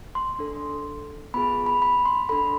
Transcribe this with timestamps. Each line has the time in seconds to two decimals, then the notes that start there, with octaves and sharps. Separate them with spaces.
0.15 C6
0.39 D4 A4
1.34 B3 F4 G#4 B5
1.66 B5
1.82 B5
2.05 C6
2.29 D4 A4 B5